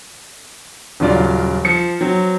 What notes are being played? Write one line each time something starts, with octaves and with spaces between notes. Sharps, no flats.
D#1 C#3 F#3 F4 D5
F3 C#7
F#3 C4